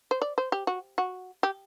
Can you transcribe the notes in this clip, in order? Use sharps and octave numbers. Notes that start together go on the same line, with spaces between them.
C5
D5
C5
G4
F#4
F#4
G4